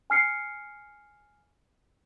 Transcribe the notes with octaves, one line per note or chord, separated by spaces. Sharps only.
G#5 F6 C7 C#7